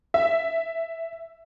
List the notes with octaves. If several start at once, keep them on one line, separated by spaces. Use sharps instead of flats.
E5